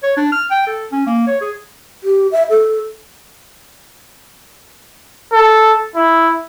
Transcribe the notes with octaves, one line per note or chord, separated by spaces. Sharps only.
C#5
D4
F6
G5
A4
C#4
A#3
C#5
G#4
G4
E5
A4
A4
E4